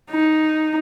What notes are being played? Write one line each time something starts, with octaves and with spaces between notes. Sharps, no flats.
D#4